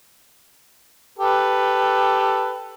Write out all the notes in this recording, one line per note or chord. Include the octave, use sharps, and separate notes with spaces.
G4 A4 B4